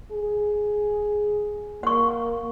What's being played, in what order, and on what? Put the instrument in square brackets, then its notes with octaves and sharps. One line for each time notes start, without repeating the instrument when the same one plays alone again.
[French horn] G#4
[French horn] A#3 [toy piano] F#5 C#6